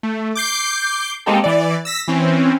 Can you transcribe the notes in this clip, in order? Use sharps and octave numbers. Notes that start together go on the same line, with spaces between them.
A3
D6 G6 C7
G#3 A#3 C4 D#4 G4 A4
E3 D5
E6 A#6 B6
E3 C4 C#4